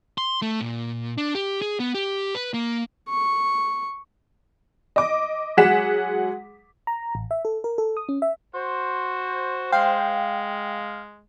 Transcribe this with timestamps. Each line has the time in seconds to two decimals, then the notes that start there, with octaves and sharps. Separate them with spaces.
0.18 C6
0.42 A3
0.61 A#2
1.18 D4
1.35 G4
1.62 G#4
1.80 B3
1.95 G4
2.35 B4
2.54 A#3
3.09 C#6
4.96 D#5 D6
5.57 F#3 G#3 G#4 F#5 B6 E7
6.87 A#5
7.15 A1
7.31 E5
7.45 A4
7.64 A#4
7.78 A4
7.97 D#6
8.09 C#4
8.22 E5
8.54 F#4 C5
9.72 G#3 F5 G5